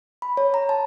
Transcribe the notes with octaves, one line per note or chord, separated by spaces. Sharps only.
B5
C#5
A#5
A5